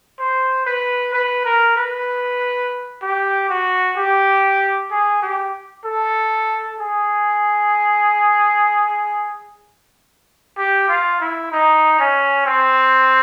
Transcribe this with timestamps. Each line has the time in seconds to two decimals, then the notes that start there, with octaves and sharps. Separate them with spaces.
0.19 C5
0.66 B4
1.13 B4
1.45 A#4
1.76 B4
3.02 G4
3.49 F#4
3.97 G4
4.91 G#4
5.22 G4
5.85 A4
6.80 G#4
10.57 G4
10.88 F4
11.20 E4
11.52 D#4
11.99 C#4
12.46 C4